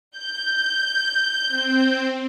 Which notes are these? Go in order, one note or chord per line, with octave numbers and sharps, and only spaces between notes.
G6
C4